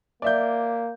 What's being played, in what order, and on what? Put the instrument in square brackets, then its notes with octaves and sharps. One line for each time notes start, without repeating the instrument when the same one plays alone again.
[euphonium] A#3 [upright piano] D5 E5 G6